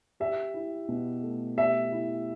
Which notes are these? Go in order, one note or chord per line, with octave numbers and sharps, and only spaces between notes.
G4 E5
E4
B2
A3
G4 E5
E4